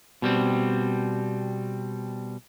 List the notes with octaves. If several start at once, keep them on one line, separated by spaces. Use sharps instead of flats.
B2 G3 C4